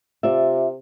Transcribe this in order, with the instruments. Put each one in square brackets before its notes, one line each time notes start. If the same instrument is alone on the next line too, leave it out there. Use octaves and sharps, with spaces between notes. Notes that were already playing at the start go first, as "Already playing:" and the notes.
[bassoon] C3 [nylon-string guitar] F4 D5 E5